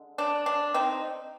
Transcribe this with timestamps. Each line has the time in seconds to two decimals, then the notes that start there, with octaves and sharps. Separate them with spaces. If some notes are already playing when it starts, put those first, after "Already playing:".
Already playing: D3 G#3
0.18 D4
0.46 D4
0.74 C4 D#4